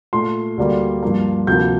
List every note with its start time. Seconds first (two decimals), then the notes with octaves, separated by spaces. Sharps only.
0.13 A#2 A3 C6
0.57 D2 D3 G3 A#3
1.03 G2 F3 A#3
1.47 D2 C3 F3 A#3 G6